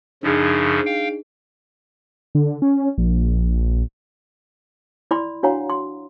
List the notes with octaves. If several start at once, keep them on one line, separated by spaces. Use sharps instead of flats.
F#2 C#3 F3 D4 D#4 G#4
F5 G5
D3
C#4
A#1
E4 D5 B5 C6
D4 F#4 C#5 F5 F#5 A#5
C6